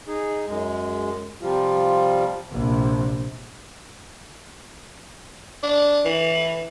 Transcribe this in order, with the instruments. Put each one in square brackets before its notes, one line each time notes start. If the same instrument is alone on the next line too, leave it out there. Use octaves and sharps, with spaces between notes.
[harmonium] D#4 G#4
F#2 G#3
C3 F3 G3 F4
[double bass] A#1 C3
[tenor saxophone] D4
E3